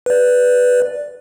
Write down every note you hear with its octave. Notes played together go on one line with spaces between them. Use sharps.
B4 D5